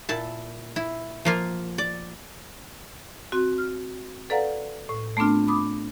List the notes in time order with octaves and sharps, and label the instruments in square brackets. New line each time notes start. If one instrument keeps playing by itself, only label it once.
[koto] A#2 E4 A5
E4
F3 A#3 F4
D5
[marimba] C4 F#4
F6
A4 B4 D5 F5 F#5 A#5
A2
A3 B3 C4 D4 F4
B5 D6 D#6